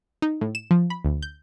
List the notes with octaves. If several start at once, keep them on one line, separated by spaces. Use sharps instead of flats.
D#4
A2
E7
F3
B5
D2
G6